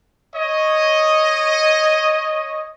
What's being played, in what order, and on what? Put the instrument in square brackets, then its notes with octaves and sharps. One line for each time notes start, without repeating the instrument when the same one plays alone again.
[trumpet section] C#5 D#5